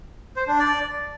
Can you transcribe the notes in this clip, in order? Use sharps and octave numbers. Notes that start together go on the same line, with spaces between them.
C5
D4
D5